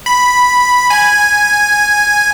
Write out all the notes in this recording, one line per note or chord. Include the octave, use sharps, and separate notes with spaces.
B5
G#5